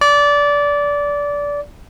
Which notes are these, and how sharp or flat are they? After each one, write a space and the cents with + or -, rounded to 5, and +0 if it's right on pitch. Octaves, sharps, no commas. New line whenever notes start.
D5 -20